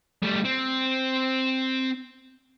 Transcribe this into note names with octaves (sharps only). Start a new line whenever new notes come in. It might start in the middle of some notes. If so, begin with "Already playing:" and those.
G3 A3
C4